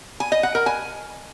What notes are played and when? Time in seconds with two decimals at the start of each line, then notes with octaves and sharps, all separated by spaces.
0.20 G#5
0.32 D#5
0.43 F#5
0.55 A#4
0.66 G#5